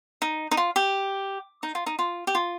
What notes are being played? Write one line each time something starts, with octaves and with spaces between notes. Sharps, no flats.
D#4
D#4
F4
G4
D#4
F4
D#4
F4
G4
F4